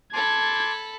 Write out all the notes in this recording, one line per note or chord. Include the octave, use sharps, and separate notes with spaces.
A4 A5 B5 C6 D6 G#6